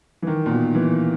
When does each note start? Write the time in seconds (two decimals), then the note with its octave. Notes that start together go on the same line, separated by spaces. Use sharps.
0.22 E3
0.27 D#3
0.46 A#2
0.51 B2
0.75 E3